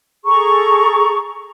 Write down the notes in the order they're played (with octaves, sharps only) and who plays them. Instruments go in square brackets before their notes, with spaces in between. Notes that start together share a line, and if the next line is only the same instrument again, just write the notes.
[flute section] G#4 A4 A#5 C#6